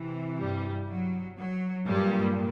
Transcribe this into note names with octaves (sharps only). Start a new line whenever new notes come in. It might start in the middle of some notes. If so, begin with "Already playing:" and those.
Already playing: C3 E3
G2 G3
F#3
F#3
G2 A#2 G3